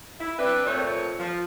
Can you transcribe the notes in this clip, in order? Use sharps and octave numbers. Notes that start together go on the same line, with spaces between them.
E4
C4 D4 B4
F2 A#2 A3 C4 C#5
F3